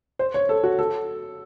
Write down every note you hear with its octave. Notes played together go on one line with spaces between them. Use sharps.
C5
C#5
A4
F#4
A4